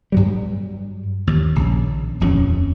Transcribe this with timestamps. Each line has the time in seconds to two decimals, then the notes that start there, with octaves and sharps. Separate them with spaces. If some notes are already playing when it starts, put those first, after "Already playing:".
0.12 G2 F#3 G3
1.27 D#2
1.56 A#1 C#3
2.20 D#1 F2 F#3 C#4